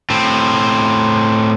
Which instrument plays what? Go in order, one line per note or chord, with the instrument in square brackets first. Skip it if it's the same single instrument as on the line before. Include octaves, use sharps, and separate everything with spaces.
[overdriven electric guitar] A2 C4